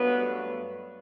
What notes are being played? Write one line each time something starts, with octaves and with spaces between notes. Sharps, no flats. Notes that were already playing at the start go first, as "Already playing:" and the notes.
Already playing: G2 F#3 A3 B3